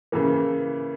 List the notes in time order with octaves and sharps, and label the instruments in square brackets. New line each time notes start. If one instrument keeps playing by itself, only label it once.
[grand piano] C#3 E3 A#3